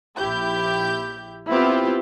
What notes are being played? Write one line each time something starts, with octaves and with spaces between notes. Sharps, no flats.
A#1 E4 G4 G6
B3 C4 E4 F4 G4 B4